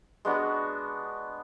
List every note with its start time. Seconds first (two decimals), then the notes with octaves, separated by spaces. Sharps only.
0.25 G#3 B3 D4 F#4